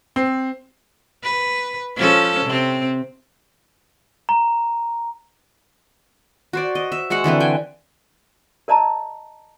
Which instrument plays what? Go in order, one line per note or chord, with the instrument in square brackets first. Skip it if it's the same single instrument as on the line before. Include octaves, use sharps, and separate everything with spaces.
[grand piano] C4
[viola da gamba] B4
F3 C#4 A4
C3 C4
[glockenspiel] A#5
[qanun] F#4 C5 D5
D#5
E5
G#3 F#4 E5 F#5
D3 E3 C4 B4
G5 G#5
[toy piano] A#4 D5 D#5 A5 A#5